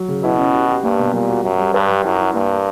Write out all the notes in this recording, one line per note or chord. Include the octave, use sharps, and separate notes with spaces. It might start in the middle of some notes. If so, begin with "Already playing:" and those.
Already playing: F#3
C#3
B2 E4
C#4
G4
G4
G2 A#3
B2
A#2 G3
F#4
F#2 F#4
G3
G2 B4
G3
F#2 E4
E4
G2 A#3
A#4